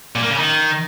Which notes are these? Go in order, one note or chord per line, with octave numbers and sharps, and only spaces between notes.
A#2
A#3
C#3
D#3